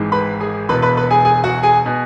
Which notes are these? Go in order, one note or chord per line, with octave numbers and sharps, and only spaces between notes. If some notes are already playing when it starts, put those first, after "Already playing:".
Already playing: G#1 G#2 E3 G#3
B4 B5
G#4 G#5
E1 E2 B2 B4 B5
B4 B5
B4 B5
G#4 G#5
G#4 G#5
F#4 F#5
G#4 G#5
B2